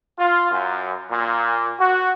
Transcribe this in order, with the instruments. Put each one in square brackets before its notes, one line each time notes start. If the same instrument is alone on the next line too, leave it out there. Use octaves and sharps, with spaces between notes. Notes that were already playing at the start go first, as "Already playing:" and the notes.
[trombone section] F4
F#2
A#2
F#4